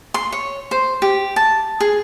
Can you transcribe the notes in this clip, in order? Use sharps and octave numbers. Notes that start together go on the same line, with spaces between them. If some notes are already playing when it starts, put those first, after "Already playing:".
C6
C#5
C5
G4
A5
G#4